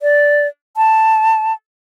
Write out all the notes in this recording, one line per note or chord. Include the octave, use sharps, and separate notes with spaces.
D5
A5